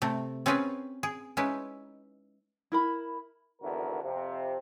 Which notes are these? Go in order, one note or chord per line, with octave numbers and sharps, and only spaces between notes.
C3 A3
C4 C#4 F4 G#4 B4 G#5
G#4
G#3 C#4 D#4 E4 B4
E4 A#4 B5
G#1 E2 D3 F#4 A#4
F2 C3